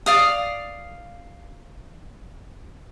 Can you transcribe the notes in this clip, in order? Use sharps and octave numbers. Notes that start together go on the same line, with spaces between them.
D5 F5 D#6